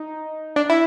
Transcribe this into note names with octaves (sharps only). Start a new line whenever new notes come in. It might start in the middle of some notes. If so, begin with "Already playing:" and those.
Already playing: D#4
D4
E4